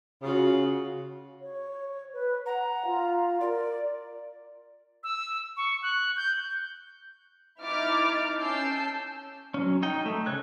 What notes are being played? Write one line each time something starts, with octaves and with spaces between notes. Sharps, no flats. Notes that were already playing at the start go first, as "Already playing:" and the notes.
C#3 F4 F#4
C#5
B4
F#5 A#5
F4
A#4 D5
E6
C#6
F#6
G6
D#4 E4 D6 F6 A6
C#4 A5 E6 G6 C7
F#3 C#4
D#4 G5
A3
C#3 C#5 F#6